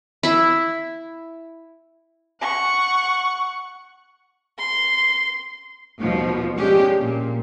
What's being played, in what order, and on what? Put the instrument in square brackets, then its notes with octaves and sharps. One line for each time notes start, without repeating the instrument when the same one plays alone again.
[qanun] E4 E5
[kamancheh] F#5 C#6
[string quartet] C6
[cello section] D#2 B2 F3
F3 G#3 C#4 D4 G4
A#2